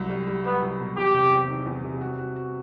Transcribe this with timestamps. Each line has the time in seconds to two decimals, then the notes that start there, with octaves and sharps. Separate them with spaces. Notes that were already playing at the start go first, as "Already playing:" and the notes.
Already playing: C2 F#3
0.09 G3
0.27 G3
0.44 G3 B3
0.62 C2
0.80 B2
0.96 E2 G4
1.14 C3
1.32 E2
1.49 D#3
1.66 E2
1.84 C3
2.01 F#4
2.19 F#4
2.36 F#4